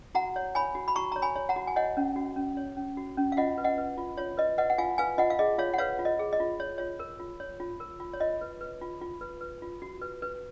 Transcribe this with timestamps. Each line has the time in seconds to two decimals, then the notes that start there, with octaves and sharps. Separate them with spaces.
0.15 F#4 F#5 A#5
0.36 C#5
0.55 C#5 G#5 B5
0.75 F#4
0.88 B5
0.95 F#4 A#5 C#6
1.12 C#5 A#5
1.22 G#5 B5
1.35 C#5
1.49 F#5 A#5
1.56 F#4
1.67 G#5
1.76 C#5 D#5 F#5
1.97 C#4
2.16 F#4
2.36 C#4
2.57 C#5
2.77 C#4
2.97 F#4
3.17 C#4
3.32 F5
3.37 F4 D#5 F#5
3.58 B4
3.64 D#5 F#5
3.78 B4
3.98 F4
4.18 F4 C#5
4.37 B4 D#5
4.58 B4 D#5 F#5
4.70 F#5
4.78 F4 F5 G#5
4.98 B4 F5 G#5
5.18 F4 D#5 F#5
5.30 F5
5.39 G#4 D#5
5.58 F4 C#5 F5
5.74 F#5
5.78 B4 C#5 F5
5.99 F4
6.05 D#5
6.19 G#4
6.33 D#5
6.40 F4
6.60 C#5
6.78 F4 C#5
6.99 A#4
7.20 F4
7.40 C#5
7.60 F4
7.80 A#4
8.00 F4
8.13 C#5
8.20 F4 D#5
8.41 B4
8.61 B4
8.81 F4
9.01 F4
9.21 B4
9.41 B4
9.62 F4
9.82 F#4
10.02 B4
10.22 B4